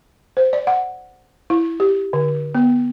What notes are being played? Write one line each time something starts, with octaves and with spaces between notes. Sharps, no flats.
C5
D5
F#5
E4
G4
D3
B3